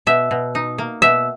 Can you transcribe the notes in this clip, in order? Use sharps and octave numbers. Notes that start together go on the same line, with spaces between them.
B2 E5
B2
D#4
A#3
B2 E5